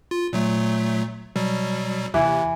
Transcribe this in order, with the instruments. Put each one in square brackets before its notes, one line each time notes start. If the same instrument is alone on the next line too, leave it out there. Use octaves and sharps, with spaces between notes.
[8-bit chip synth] F4
A#2 F#3 A3
B2 F#3 G3
[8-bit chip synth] D#2 C3 [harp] E3